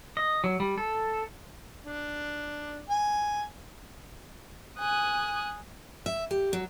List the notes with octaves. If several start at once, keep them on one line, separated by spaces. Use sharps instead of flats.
D#5
F#3
G3
A4
D4
G#5
G#5 D#6 F#6
E5
G4
F#3